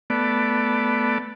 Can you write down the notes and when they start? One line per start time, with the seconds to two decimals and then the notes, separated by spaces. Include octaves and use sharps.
0.10 A3 B3 D5